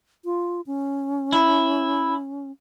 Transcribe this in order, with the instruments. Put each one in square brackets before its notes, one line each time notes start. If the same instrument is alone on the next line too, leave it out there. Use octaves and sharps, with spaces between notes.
[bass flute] F4
C#4
[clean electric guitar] E4